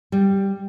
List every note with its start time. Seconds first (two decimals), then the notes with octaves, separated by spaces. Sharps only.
0.12 G3